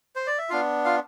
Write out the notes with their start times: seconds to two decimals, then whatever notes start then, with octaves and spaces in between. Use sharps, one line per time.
0.16 C5
0.27 D5
0.38 E5
0.49 B3 D4 F4 F5
0.85 F4 F5